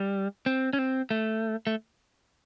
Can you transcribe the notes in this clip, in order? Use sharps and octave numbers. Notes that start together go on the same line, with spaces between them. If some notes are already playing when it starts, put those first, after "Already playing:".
Already playing: G3
C4
C#4
C4
A3
A3